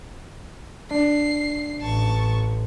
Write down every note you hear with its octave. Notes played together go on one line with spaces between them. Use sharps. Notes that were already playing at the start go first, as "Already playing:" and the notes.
D4 C7
A1 A5 C#6